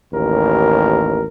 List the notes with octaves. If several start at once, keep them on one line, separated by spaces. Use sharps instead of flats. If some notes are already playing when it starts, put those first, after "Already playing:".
A1 D#2 A#4